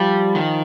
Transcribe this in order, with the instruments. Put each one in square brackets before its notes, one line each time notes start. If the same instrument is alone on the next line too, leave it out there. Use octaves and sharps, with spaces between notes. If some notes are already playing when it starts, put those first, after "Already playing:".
Already playing: [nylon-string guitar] F3 [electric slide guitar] G3
[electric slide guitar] D#3